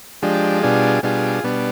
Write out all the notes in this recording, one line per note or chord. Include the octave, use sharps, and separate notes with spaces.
F3 G#3 D4 G4
B2 G3 D4 F4 G#4
B2 G3 D4 F4 G#4
B2 G3 B3 D4